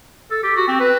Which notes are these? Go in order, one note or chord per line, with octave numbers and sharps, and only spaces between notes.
A4
G4
F#4
C4
B4